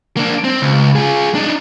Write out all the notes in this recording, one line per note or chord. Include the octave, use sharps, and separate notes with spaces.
A#3 D4
C4
C#2
F4 G#4
D4 D#4